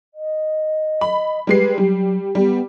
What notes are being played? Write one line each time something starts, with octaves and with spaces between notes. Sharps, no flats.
D#5
B5
G3 G#3 B4 C7
F#3 G3
G3 B3